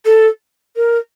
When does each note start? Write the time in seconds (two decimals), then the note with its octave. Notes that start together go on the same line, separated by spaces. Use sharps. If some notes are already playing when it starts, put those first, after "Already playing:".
0.05 A4
0.76 A#4